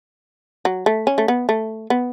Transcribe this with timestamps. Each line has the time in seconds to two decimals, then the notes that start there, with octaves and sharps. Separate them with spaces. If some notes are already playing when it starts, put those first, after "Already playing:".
0.65 F#3
0.86 A3
1.07 C#4
1.18 A3
1.28 B3
1.49 A3
1.90 B3